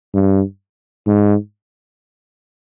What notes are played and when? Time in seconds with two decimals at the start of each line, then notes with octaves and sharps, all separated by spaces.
0.14 G2
1.07 G#2